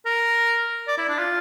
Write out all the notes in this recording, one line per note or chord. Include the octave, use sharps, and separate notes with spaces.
A#4
D5
E4
D4
F4